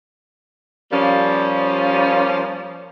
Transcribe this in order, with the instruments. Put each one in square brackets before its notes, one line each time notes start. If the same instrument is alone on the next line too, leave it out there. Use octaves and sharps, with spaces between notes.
[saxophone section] F3 G3 A#3 C#4